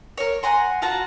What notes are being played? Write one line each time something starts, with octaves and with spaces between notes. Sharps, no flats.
A#4 C#5
F#5 G#5 A#5 C6
F4 F#4 A5 A#5